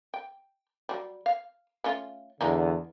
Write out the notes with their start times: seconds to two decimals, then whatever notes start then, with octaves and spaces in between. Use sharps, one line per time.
0.14 G5
0.89 F#3 G3
1.26 F5
1.84 A3 C#4 F4
2.41 E2 D3 E3 G#3 D#4